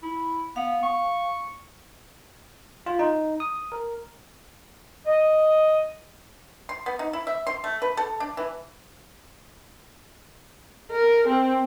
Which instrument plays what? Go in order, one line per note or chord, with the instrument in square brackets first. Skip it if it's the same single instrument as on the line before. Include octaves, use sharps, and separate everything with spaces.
[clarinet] E4
[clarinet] B3 [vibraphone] F5
[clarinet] C#6
[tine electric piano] F4
D#4
D#6
A#4
[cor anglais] D#5
[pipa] C6
B3
D#4
E4
E5
C6
A3
B4
A4
D4
E3
[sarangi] A#4
C4